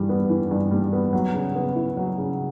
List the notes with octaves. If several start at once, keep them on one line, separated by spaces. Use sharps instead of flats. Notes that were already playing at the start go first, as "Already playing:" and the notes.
Already playing: G2 E3 G3
B3
E3
G2
G3
B3
F#3
C#3
B3
E4
F#3
C#3